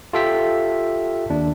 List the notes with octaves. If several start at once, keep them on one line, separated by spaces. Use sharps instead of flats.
F4 G4 A4 E5 G5 B6
D#2 D4